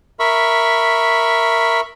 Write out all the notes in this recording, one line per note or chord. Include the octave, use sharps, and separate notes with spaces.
A#4 E5 B5 C#6